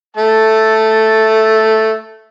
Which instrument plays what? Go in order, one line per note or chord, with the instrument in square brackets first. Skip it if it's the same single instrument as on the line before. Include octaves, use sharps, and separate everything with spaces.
[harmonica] A3 A5